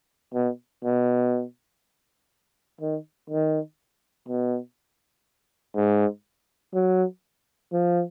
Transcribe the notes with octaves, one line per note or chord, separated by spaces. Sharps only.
B2
B2
D#3
D#3
B2
G#2
F#3
F3